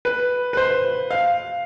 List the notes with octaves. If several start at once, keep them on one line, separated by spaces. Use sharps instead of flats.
B4
B4
C5
F5